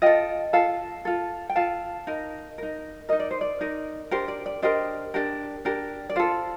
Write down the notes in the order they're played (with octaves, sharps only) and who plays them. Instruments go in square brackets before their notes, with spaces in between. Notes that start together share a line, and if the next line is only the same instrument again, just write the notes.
[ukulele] F4 A4 D#5 G5
F4 A4 F5 A5
F4 A4
G5
F4 A4 F5 A5
D#4 A#4
D#4 A#4
D#4 A#4 D#5
D5
C5
D5
D#4 A#4
D4 G4 A#4 C5
D5
D5
D4 G4 A#4 C5 D#5
D4 G4 A#4
D4 G4 A#4
D5
F4 A4 C5